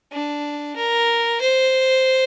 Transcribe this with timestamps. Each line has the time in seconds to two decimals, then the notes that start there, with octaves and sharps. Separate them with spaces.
0.12 D4
0.76 A#4
1.41 C5